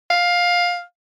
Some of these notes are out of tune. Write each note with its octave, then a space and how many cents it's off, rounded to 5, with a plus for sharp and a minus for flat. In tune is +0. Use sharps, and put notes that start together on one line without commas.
F5 +15